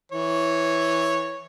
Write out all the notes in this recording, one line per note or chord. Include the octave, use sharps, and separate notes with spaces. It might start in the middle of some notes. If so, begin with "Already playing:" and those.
E3 C#5